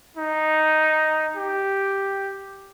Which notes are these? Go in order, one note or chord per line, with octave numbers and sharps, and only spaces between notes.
D#4
G4